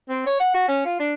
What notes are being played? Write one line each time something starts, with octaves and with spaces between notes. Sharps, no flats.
C4
C#5
F#5
F#4
C#4
F4
D4